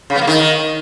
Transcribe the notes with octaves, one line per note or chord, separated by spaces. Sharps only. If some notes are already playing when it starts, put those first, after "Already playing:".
C#3
B3
A#3
D#3